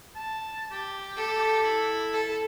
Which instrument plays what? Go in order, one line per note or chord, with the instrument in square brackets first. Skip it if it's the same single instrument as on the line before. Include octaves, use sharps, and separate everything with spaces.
[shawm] A5
G4
[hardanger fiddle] A4
[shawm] E4
[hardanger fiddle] A4